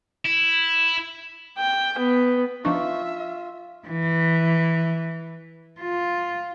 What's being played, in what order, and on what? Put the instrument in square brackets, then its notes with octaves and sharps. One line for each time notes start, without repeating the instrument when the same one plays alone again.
[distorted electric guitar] E4
[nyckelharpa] G5
B3
[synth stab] F3 D4 D#4 [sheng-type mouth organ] F4 [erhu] E5 [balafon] C#6
[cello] E3
F4